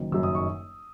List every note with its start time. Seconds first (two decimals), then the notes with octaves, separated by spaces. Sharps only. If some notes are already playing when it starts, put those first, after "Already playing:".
Already playing: F#1 F#2 D#3
0.12 F#1 F#2 D#3 E6
0.23 D#6
0.35 C#6